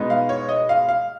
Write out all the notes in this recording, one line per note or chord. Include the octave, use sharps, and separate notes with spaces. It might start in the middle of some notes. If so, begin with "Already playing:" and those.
Already playing: B2 G#3 B3 D#4
F5
C#5
D#5
F5
F5